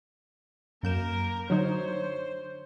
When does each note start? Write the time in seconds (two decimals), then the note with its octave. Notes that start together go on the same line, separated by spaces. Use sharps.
0.83 F#2 A#3 A#4 G6 E7
1.50 D3 F#3 D#4 C5 C#5